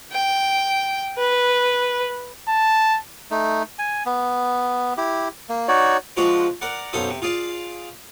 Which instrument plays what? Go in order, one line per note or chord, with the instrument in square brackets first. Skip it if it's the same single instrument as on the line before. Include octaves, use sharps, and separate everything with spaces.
[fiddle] G5
B4
[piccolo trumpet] A5
[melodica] A3 D#4
G#5
B3
E4 G4
A#3
D#4 F#4 C#5 D5
[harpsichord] F3 G#3 D4 F4 F#4 C5
A#4 D5 F#5
B1 F#2 A4 C5 F5 D#6
C3
F4 G#4 D5 F5